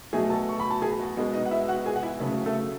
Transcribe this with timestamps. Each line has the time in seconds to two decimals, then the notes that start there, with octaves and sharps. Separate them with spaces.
0.13 B2 F#3 A3 G#4 G#5
0.30 A4 A5
0.49 C#6
0.60 B5
0.71 A5
0.82 G#4 G#5
1.00 F#4 F#5
1.17 B2 G#3 B3
1.33 D#4 D#5
1.46 F#5
1.51 E4 E5
1.68 F#4 F#5
1.86 G#4 G#5
1.96 F#5
2.03 E4 E5
2.20 C#3 F#3 A3 B3 B4
2.46 A3 A4